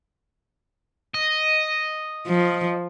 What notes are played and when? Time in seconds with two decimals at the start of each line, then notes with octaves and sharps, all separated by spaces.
1.14 D#5
2.27 F3